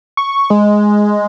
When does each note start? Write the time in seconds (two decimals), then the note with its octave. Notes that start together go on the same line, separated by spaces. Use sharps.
0.17 C#6
0.50 G#3